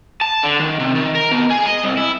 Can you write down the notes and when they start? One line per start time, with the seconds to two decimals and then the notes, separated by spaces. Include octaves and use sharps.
0.21 A5
0.43 D3
0.60 D#3
0.80 C3
0.95 D#3
1.15 A#4
1.32 B2
1.51 G#4
1.66 D#5
1.84 C2
1.98 E4